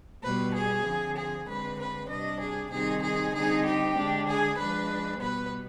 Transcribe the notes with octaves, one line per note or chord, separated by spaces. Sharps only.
B2 G3 B3 B4
G#4
D3 F3 C4
G#4
D3 G#3 C4 B4
B4
C3 G3 D4 D#5
G#4
C3 D#3 G3 C4 D#4 G#4
G#4
D3 G3 C4 D#4 G#4
G4
D3 G#3 D4
G#4
F3 G#3 D4 B4
B2 G3 B3 B4